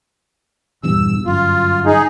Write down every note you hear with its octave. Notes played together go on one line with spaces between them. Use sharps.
D#1 E2 G2 E6
G1 F#2 F4
D#4 G#4